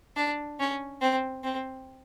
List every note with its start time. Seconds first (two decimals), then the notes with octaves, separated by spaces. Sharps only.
0.16 D4
0.60 C#4
1.01 C4
1.44 C4